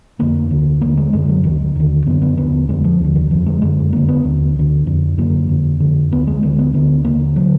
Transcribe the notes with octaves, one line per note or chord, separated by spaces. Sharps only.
F2 D3 A#3
D2 D3
D#2 D3 A#3
G#3
F#2 D3 G#3
F#3
D2 D3 D#3
D#2 D3
F#2 D3 B3
B3
D#2 D3 B3
F2 D3 G#3
F3
D#2 D3
D#3
F2 D3 F3
G#3
F#2 D3 G#3
F2 D3 A#3
B3
D#2 D3
D2 D3
F2 D3
F#2 D3 A#3
F2 D3
F2 D3
D2 D3 B3
G#3
D2 D3 G#3
B3
D2 D3 B3
D#2 D3 A#3
D3 F#3